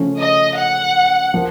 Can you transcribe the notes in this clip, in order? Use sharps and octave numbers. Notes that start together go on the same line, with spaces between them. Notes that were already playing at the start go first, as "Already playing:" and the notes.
Already playing: C#3 F3 A3 C#4
D#5
F#5
F3 A#3